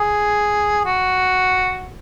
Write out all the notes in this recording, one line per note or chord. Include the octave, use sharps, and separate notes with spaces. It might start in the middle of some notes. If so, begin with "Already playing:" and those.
Already playing: G#4
F#4